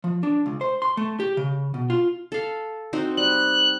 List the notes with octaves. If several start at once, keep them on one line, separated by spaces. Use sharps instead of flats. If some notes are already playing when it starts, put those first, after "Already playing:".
F3
D4
C#2
C5
C6
A3
G4
C#3
B2
F4
A4 F5
C4 D#4 F#4
G3 F#6